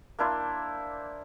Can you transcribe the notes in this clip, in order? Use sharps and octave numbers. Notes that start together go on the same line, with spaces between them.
A#3 D4 E4 C5